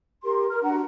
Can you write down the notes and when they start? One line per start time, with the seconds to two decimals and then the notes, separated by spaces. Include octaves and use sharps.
0.24 G4 A#4 C6
0.51 A#4 F6
0.63 D4 F#4 F#5 A#5